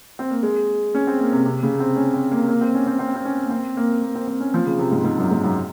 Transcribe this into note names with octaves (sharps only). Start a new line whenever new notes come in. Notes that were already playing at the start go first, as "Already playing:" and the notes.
C4
A#3
G#3
C#4
C4
A#3
C3
C3
C#3
C4
C#4
C4
A#3
A#3
C4
C#4
C4
C4
C4
C#4
A#3
C4
A#3
A#3
C4
C4
C#4
F3
C#3
C3
G#2
G#2
F#2
G#2
F#2